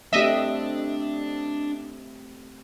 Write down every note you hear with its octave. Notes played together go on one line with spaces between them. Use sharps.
A3 C4 D4 G4 D#5 E5